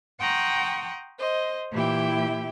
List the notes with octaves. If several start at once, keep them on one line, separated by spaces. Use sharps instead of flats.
F#5 G5 A#5 C6 C#6 D#6
C5 D#5
A#2 E3 E4 G4 E5 G5